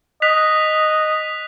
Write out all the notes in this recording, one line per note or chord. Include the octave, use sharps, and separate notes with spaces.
D#5 F#6 B6 F7